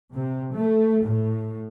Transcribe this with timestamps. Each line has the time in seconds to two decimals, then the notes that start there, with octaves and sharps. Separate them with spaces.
0.13 C3
0.52 A3
1.03 A2